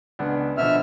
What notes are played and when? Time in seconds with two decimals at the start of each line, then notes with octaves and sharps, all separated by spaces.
0.19 C#2 B3 D4
0.57 B2 D3 F3 E5 F6